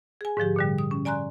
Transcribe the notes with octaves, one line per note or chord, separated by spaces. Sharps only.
G#4 G#5
G#2 D3 F3 G4
A#2 D3 G3
D#6
C#4
D5 G#5 A#5 C6 F#6